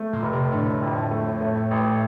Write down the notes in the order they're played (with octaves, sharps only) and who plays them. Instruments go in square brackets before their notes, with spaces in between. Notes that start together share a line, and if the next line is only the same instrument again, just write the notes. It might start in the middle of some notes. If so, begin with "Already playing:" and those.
Already playing: [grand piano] A3
[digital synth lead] A#2
[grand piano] F1
[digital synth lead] C3
[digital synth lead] A2 [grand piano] D3
[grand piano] F2
A3
A3
A1